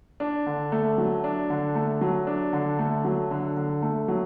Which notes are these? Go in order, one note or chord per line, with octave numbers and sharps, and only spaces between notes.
D4
D3
A3
F#3
D4
D3
A3
F#3
D4
D3
A3
F#3
D3
D3
A3
F#3